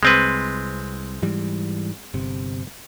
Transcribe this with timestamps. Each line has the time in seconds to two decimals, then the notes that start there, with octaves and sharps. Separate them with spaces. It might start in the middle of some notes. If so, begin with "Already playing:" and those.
0.03 C2 G#3 C4 B4
1.22 G#2 E3 G3
2.14 G1 C3